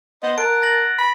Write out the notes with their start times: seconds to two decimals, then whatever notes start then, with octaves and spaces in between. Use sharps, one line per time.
0.23 B3 C5 D#5
0.38 A#4 F#5 A5 D7
0.62 A6 A#6 F#7
0.98 B5